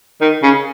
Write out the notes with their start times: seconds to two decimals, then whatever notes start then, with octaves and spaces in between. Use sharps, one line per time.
0.21 D#3
0.43 C#3